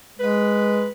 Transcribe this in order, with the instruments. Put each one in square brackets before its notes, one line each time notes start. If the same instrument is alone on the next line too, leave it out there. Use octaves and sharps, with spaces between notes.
[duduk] G#3 [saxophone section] B4